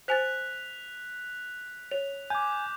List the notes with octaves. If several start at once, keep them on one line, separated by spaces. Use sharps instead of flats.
C5 G#5 F#6 A6 B6 F7
C#5 F7
G#5 D6 G6